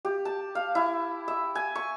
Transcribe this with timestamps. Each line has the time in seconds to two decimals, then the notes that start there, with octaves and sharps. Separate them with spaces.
0.05 G4
0.25 A5
0.55 F5
0.75 E4
1.28 E5
1.55 G#5
1.75 C#6